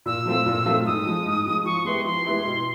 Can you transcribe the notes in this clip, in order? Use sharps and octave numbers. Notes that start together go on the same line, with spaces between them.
A#2 E6
F#3 A3 C4 F4
A#2
F#3 A3 C4 F4
G#2 D#6
F3 G#3
G#2
F3 G#3
F3 C#6
G#3 B3 E4 G4 C6
F3 C6
G#3 B3 E4 G4
B2